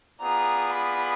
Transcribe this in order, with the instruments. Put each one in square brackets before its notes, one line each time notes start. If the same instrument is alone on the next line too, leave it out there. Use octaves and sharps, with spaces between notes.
[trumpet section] B3 F4 G#4 D5 [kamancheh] A#5
[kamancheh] B5